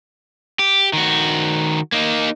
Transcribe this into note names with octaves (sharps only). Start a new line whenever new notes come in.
G4
D#3 F#4
A#3 D#4